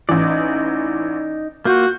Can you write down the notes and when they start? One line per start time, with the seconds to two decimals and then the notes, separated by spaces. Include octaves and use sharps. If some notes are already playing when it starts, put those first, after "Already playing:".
0.09 A1 E3 D#4 D5
1.65 A#3 F4 F#4 G6